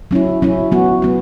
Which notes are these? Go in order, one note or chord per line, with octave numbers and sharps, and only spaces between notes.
F#3 C#4 E4
F#3 C#4 E4
F#3 B3 F#4
F#3 B3 F#4